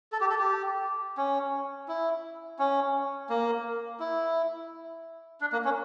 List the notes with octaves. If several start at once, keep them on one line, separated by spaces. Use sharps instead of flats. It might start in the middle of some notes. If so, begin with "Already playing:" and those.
A4
G4
A4
G4
C#4
E4
C#4
A#3
E4
D4
A#3
C#4